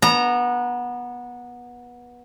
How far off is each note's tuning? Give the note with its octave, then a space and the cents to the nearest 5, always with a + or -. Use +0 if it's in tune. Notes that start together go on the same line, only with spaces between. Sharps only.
B3 -20 A#5 +0